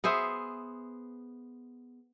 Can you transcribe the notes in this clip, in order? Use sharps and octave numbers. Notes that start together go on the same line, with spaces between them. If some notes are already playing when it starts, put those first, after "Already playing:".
B3 G#4 C5 E5